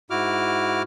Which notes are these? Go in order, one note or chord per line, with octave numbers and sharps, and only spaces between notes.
G#2 E4 F#4 D6 F6